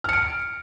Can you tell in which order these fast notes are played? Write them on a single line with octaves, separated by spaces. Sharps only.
F6 C#7 D7